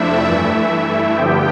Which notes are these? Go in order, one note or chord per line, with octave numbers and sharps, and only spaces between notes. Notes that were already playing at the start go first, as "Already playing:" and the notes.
Already playing: F2 C3 F3 A3 D4 E4 E5
G2 E3 A3
G2 D3 F3 B3 G4 G5